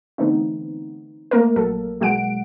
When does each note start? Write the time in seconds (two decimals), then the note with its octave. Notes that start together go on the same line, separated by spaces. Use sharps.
0.18 D3 E3 A3 B3 C4 D#4
1.31 A3 A#3 A#4
1.56 A#1 F#3 A4
2.01 B2 F#3 G#3 F#5 D7